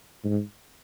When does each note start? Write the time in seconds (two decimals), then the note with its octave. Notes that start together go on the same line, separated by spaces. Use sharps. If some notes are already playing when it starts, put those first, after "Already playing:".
0.24 G#2